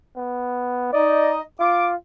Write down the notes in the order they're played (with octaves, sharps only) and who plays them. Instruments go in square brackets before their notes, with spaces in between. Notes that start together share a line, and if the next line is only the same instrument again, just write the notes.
[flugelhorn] B3
[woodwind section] D#4 D#5 [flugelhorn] D5
[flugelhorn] F4 [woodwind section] D6